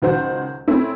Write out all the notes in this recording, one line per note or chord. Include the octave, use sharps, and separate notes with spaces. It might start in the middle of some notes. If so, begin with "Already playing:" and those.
C#2 D#3 F#3 C5 F#5 G6
A3 C4 C#4 E4